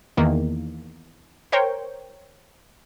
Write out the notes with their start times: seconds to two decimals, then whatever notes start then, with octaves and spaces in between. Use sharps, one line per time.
0.17 E2 D#3 A#3
1.52 A#4 C5 C#5 G5